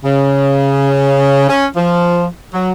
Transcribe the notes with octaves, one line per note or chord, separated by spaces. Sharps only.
C#3
C#4
F3
F#3